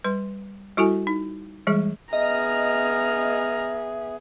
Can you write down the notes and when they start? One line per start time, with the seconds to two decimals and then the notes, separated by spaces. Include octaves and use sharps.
0.04 G3 B4 C6
0.77 G3 E4 F#4 A4 G#5
1.07 D#4
1.67 E3 G3 G#3 G#4
2.13 B3 G#4 D#5 E5 A#5 F6